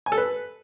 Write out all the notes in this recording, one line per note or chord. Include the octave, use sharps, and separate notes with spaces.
G#5
A4
B4